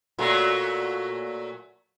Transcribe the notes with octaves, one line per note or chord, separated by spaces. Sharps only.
A#2 F#3 A3